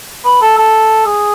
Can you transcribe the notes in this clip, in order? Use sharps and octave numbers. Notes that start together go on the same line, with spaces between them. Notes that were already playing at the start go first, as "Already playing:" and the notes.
B4
A4
A4
G#4